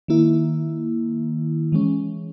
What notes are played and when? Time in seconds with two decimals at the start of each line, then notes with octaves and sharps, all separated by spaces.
0.08 D#3 A#3 E4
1.72 E3 G#3 C#4